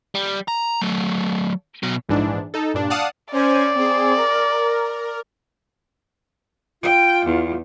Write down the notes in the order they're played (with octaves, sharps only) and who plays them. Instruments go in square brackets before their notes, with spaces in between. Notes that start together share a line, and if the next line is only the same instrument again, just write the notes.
[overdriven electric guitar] G3
A#5
F#3 A3
B2 F#3
[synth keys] A#1 G#2 E3 D4
D#4 A4
G2 A#2 D4
D5 F5 F#5 A5 D#6
[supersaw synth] C#4 C5 G#5 [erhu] D5
[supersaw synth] C4 G#4
A#4
[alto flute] F4 [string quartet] G5
[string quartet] E2